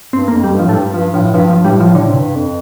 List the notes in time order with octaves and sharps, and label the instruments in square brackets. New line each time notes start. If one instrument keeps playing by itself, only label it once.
[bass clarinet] G2 [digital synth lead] C4
[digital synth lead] A#3
[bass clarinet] F2
[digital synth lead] G3
[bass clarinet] G2
[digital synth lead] F3
[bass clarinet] A2
[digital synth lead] A3
[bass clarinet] G2 [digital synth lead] G3
[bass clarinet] G2 [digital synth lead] F3
[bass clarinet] A2 [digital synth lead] F3
[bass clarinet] G2 [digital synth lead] F3
[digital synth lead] F3
[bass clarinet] A2 [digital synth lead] G3
[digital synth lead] F3
[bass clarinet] A2 [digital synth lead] D3
[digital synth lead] C3
[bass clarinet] G2
F2